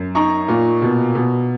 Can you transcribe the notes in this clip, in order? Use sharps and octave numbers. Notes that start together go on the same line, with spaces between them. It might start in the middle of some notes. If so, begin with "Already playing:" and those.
Already playing: F#2
D#4 A#5 C#6
A#2
B2
B2